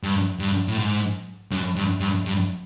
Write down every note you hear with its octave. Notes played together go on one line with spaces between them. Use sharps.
G2
G2
A2
G#2
F#2
G2
G2
G2